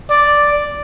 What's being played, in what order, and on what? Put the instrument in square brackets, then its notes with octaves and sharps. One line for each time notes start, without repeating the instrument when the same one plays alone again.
[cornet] D5